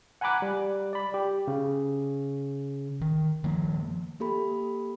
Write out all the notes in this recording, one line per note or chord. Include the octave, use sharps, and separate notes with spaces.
F#5 G#5 A#5 B5 D6 F#6
G3
D5 B5
G4
C#3
D#3
D#3 F3 A#3
A#3 G4 A4 B5